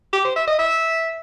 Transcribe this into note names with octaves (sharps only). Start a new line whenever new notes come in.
G4
C5
E5
D#5
E5